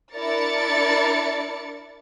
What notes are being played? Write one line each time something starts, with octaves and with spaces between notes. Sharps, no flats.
D4 E4 A#4 D5 A6 C#7